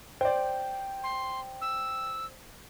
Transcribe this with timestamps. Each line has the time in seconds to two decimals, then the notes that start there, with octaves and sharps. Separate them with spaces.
0.21 C5 D5 G5
1.04 C6
1.61 E6